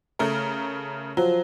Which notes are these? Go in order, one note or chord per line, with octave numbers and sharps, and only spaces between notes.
C#3 A3 A#4
F3 F#3